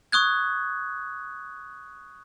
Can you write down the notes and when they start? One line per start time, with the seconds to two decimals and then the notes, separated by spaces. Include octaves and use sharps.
0.12 C#6 D#6 F#6 G#6